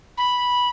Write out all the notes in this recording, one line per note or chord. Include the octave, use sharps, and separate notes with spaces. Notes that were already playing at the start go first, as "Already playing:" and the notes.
B5